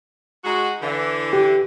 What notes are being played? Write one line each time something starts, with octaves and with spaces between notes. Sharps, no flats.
G#3 D#4 F#4
D3 E3
G4